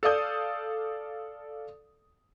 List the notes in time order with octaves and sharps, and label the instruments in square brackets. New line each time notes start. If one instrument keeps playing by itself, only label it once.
[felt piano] A4 D5 F5 D#6 G6